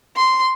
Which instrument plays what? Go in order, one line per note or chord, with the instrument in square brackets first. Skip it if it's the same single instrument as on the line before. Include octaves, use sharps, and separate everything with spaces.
[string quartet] C6